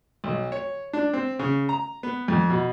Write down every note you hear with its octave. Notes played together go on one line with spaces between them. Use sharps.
B1
C#5
D4
C4
C#3
A#5
B3
F2
B2